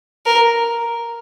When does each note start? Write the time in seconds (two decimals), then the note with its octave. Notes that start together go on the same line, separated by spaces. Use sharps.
0.26 A#4